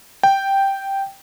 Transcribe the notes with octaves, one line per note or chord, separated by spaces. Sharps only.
G5